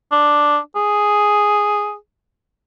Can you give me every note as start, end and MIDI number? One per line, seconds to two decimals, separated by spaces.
0.12 0.58 62
0.76 1.95 68